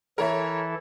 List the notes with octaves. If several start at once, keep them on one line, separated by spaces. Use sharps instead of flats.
E3 E4 A4 A#4 C#5 E5